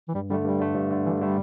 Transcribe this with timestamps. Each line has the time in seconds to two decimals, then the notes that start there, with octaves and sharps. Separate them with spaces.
0.08 E3
0.15 G2 G3
0.30 D3 G3
0.33 A3
0.44 G2 G3
0.60 D3 A3
0.75 G2
0.91 D3 A3
1.06 G2 E3
1.20 D3 G3 A3